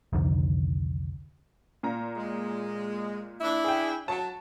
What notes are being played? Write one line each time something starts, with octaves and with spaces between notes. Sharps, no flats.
C2 F2 D3 D#3
A#2 A#5
G#3
D4 E4
G#4 G5
F#3 A5